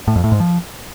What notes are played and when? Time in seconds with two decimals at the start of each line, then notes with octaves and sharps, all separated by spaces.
0.08 A2
0.16 F2
0.24 A2
0.32 G#2
0.40 F3